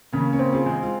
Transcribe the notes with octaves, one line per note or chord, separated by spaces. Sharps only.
C#3 A#3 C#4
A#3 C#4
C4
F4 G#4
G#3
F4